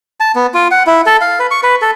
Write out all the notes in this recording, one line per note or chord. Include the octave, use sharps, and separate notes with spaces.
A5
B3
F4
F#5
E4
A4
F5
B4
C#6
B4
A4